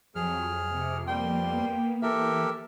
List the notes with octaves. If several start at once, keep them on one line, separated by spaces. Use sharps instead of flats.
F2 F#3 G#4 F6
C3
G3 A#3 B3 G5 C6
E3 G4 A4 A#4 E5